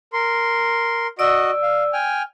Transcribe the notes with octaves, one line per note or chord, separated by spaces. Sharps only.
A#4 C6
F#4 D5 D#5 E6
F5
G5 G#5 F6